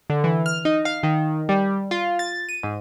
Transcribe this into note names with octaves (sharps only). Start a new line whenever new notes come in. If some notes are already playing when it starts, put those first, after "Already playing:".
D3
E3
F6
D#4
F5
D#3
G3
F4
A6
D#7
G#2